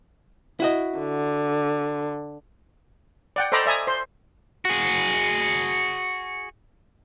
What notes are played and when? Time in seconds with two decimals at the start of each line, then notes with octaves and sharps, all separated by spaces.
0.60 E4 F#4 D#5
0.99 D3
3.36 D5 F#5 G5
3.52 A4 C5 D#5 A#5 B5 D6
3.66 D5 E5 G#5 A#5 D#6
3.87 C5 C6
4.65 F#4 G#4